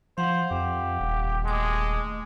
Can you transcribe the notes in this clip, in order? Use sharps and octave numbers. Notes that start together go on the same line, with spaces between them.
F3 C5 F5 F#5
F2 G4
D#1
G#3 A3 D6